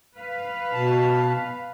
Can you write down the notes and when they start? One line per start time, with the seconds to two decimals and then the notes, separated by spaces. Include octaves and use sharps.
0.16 B4 F5
0.73 B2 A5